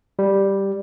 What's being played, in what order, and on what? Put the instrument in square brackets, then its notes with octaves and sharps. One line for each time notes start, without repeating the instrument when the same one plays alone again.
[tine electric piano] G3